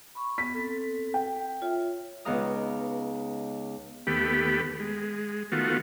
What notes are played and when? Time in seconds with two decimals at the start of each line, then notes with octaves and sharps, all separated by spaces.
0.15 B5 C#6
0.38 B3 B6
0.54 C4 A4
1.14 G5
1.62 F4 C#5 E5
2.25 C#2 B3 D#4 F5 A#5 D#6
4.07 D#2 A3 B3 G4 B5
4.79 G#3
5.52 D#3 A3 B3 F4 F#4